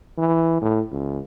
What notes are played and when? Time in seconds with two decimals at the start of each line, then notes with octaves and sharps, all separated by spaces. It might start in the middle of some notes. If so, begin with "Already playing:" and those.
0.18 E3
0.62 A2
0.92 C#2